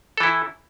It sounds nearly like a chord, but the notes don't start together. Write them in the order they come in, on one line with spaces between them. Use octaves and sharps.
A4 E3 E4